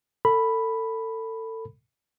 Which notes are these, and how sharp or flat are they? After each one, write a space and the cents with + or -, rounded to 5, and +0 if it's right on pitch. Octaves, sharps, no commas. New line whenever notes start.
A4 +30 B5 +0